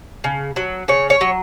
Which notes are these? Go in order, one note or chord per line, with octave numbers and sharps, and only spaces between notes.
C#3
F#3
C#3 C#5
C#5
F#3